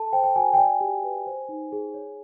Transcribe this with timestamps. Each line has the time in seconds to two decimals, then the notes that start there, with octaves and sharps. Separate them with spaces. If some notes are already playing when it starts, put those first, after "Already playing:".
Already playing: A4 A5
0.13 C5 G5
0.24 G5
0.36 F#4 G#5
0.53 G5
0.58 D5 G#5
0.81 G4
1.04 B4
1.27 C5
1.49 D#4
1.72 G#4
1.94 C#5